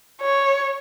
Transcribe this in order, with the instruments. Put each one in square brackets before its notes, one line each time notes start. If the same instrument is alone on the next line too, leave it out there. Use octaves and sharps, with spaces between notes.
[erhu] C#5